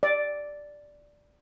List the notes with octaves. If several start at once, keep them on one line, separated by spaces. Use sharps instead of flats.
D5